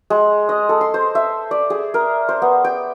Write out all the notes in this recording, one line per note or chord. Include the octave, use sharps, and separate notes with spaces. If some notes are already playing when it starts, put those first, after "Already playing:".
G#3
D#5
A4
C6
C5
E5
D5
G#4
A#4
C5
B3
G5